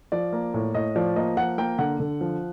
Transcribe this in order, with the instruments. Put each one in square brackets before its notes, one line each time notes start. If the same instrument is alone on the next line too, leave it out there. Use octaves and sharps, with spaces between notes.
[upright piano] F3 D5
A#3
A2
A2 D#5
F3 D5
A#3 D#5
F3 F#5
A#3 G5
D3 F#5
D3
F3